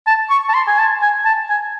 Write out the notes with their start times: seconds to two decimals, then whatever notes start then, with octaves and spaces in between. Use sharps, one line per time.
0.07 A5
0.30 C#6
0.49 A5
0.54 C6
0.67 G#5
0.79 A5
1.02 G#5
1.25 A5
1.49 G#5